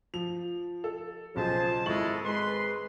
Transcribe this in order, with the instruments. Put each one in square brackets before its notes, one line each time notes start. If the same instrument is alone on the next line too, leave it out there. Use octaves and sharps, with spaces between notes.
[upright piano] F3 F7
A4
[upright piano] B1 C#3 [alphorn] F3 [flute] G#4 [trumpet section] C5 A5
[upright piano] G#1 C#6 F#7 [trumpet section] G#3 [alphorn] E4 [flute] A4
[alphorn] G#3 [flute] B4 [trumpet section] C6